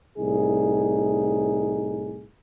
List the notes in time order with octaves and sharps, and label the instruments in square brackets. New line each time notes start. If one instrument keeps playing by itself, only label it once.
[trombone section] C2 A2 D#4 G#4